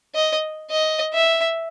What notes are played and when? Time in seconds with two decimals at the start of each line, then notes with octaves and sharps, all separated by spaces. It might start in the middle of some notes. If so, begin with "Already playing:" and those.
0.15 D#5
0.71 D#5
1.13 E5